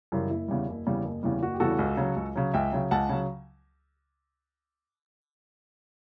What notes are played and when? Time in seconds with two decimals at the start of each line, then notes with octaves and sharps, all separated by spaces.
0.12 F#2 C#3 E3 G3
0.30 F#1 E4
0.48 E2 C#3 E3 G3
0.68 F#1
0.86 E2 C#3 E3 G3
1.05 F#1
1.23 E2 C#3 E3 G3
1.43 F#1 F#4
1.54 G4
1.60 E2 C#3 E3 G3 F#4 A4
1.79 C#2
1.97 C#3 F#3
2.16 C#2
2.36 C#3 F#3
2.53 C#2 E5 G5
2.72 C#3 F#3
2.91 C#2 F#5 A5
3.09 C#3 F#3